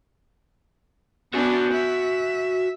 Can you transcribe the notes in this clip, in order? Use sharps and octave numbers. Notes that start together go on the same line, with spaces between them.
B3 D4 F#4 G#5
E5